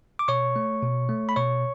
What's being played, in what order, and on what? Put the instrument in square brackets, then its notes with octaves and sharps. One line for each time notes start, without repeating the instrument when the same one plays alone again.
[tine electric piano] D6
B2 C#5 C#6
A3
B2
A3
B5
B2 C#5 C#6